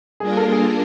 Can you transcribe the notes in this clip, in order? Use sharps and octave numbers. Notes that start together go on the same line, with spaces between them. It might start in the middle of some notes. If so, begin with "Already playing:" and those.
G3 A#3 D4 F4 G#4 A#4
A4
G#4